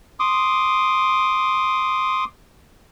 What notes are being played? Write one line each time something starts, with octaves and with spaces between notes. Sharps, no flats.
C6 D6 D#6